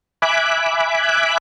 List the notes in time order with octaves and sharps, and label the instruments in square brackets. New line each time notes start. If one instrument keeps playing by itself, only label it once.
[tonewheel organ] E5 G#5 B5 D6 F#6